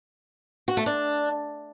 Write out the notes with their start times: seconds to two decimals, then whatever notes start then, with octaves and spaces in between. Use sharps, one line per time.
0.68 F#4
0.77 A3
0.86 D4